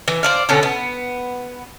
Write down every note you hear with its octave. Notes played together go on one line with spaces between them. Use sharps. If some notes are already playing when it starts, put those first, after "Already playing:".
E3
C5 D5 F5
B2 D3 C#4
B3